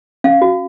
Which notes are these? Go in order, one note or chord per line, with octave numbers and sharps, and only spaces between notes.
C#4 F5
F#4